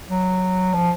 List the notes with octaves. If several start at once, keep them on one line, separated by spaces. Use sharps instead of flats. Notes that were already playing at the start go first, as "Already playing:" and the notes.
F#3
F3